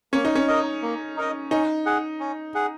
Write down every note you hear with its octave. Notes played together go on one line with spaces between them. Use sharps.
A#3 C#4
D#4
C#4
D#4 A#4 D#5
A#3
D#4 A#4 D#5
C#4 D#4
G#4 F#5
C#4
G#4 F#5